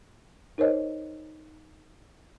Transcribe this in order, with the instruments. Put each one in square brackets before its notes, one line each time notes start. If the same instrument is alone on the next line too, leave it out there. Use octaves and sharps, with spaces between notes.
[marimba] D#4 A#4 C5 C#5 D#5